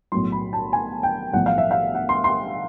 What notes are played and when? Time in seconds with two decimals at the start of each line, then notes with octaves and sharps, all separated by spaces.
0.12 B1 A2 F#3 C6
0.32 B5
0.53 A5
0.73 G#5
1.03 G5
1.33 B1 A2 F3 F#5
1.46 F5
1.58 E5
1.71 F5
1.95 F#5
2.09 C6
2.24 C6